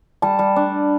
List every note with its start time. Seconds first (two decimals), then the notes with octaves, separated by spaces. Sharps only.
0.22 G3 A5
0.39 G3
0.56 D4